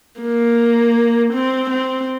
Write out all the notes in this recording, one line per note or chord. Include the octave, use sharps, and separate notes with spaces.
A#3
C4
C4